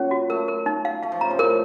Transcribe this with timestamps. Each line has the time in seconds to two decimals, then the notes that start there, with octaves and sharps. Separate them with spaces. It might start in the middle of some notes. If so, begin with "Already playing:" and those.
Already playing: A#2 F#3 C#4
0.11 F#4
0.30 A3 A#4
0.48 A#4
0.66 D#4
0.85 F5
1.03 A3 F5
1.12 F3
1.21 C#3 A#5
1.30 C3
1.39 A2 A#4